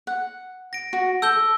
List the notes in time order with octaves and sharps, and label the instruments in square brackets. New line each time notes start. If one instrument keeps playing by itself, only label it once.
[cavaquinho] F#5
[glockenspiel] A#6 D7
[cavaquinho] F#4
[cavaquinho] A4 [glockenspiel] E6 G6 G7